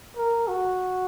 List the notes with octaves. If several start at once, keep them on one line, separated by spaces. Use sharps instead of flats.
A#4
F#4